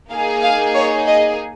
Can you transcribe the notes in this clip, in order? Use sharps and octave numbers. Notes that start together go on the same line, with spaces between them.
A#3 D#4 G#4 F5
F5
C#5
D#5